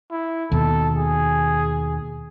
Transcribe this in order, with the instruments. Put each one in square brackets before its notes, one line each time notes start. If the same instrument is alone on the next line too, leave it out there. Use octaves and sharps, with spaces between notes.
[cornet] E4
[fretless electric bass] D#2 B2 [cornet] A4
[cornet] G#4